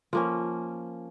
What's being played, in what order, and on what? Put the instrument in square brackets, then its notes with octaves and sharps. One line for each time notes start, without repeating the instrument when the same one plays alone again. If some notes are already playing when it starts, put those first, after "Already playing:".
[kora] F3 A#3 C#4